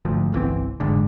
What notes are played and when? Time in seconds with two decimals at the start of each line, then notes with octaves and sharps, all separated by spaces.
0.05 G#1 D2 F3
0.32 G1 C2 E3 C4
0.80 F1 G#2 D3